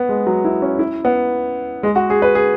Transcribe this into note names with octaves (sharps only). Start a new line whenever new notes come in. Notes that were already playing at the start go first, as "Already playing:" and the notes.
Already playing: B3
G#3
F#3
E4
C#4
E4
B3
G#3
F#4
G#4
B4
G#4